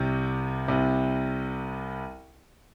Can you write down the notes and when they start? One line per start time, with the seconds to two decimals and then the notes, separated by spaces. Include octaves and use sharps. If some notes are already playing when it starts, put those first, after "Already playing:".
Already playing: C2 C3
0.68 C2 C3